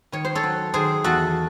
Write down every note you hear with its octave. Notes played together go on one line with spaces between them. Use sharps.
D#3 C#5
C5
A4 C#5
F#3
D#3 G#4 C5
E2 F#4 A4